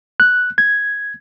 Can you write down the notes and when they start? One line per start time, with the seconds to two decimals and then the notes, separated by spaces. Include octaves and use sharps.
0.20 F#6
0.58 G#6